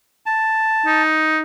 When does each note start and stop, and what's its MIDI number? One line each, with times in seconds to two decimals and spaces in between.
0.26 1.02 81
0.86 1.42 63